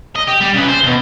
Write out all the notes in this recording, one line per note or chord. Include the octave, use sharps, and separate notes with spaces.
D#5
G4
G3
C#3 B4
C5
D2 B2